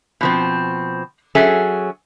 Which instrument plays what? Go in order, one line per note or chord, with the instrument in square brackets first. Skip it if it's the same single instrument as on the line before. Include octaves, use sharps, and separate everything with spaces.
[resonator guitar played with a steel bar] B2 F3 C4
F#3 C#4 G#4 A4 E5